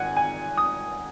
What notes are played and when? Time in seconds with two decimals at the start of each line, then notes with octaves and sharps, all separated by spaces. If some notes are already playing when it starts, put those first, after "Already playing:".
Already playing: G#1 G#2 D#3 F#5 G#5
0.17 G#5
0.57 D#6